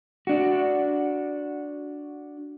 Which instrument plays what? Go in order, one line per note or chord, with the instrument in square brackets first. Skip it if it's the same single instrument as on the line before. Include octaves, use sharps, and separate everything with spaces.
[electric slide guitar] D4 F#4